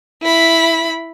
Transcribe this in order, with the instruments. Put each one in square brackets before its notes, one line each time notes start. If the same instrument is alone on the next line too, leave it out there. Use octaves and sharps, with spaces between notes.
[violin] E4 B5